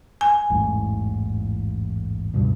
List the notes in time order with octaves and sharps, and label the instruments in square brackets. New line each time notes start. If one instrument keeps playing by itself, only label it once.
[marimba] G#5
[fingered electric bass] A1 E2 G#2
C#2 G2 B2